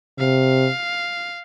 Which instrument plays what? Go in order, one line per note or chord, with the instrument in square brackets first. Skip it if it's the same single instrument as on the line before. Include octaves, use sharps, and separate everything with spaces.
[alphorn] C3 [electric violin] F5